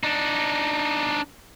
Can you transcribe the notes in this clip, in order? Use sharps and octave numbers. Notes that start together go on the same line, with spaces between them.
D4 D#4